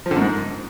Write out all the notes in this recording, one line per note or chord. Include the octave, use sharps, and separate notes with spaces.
F3
D3
F#2
G#2